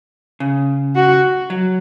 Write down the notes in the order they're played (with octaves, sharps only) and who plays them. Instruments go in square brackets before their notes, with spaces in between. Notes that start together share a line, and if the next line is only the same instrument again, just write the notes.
[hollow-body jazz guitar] C#3
[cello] F#4
[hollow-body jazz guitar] F#3